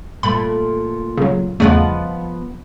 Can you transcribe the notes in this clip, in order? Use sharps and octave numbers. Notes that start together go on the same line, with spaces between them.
A#2 A3 B5
C#3 F#3
E2 C#3 F3 A3 B3 D#5